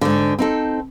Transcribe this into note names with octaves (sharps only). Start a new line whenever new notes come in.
G#2 D3
C4 D#4 A4